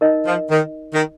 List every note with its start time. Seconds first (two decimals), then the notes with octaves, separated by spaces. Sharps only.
0.01 D#4 A#4 D#5
0.26 F3
0.51 D#3
0.94 D#3